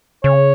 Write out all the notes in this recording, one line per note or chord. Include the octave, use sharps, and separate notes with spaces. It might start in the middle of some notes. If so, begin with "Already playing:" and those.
C#3 C#5